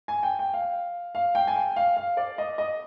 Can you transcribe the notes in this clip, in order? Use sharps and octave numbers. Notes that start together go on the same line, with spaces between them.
G#5
G5
G5
F5
F5
G5
G#5
G5
F5
F5
D5
D#5
D#5